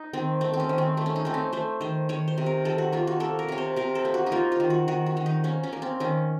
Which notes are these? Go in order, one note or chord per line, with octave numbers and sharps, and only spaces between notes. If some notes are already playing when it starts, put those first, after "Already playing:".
Already playing: D#4
D#3 C4
A3 C4
C4
C#4
D#3
C4
A3
C#4
D#4
A3 C4
C#4
A3 C5
D#3 C5
D#3 C#5
C5
C3
A#4
D#3 A4
F#4
A#3 F4
F#4
A#3 A4
A#4
C3 C#5
C5
C3 A#4
A4
A#3
F#4
D#4
A#3 F4
F4
D#3
F#4
D#3 F#4
F#4
D#3
D#4
A#3 C#4
C#4
A#3
C4
D#3 C#4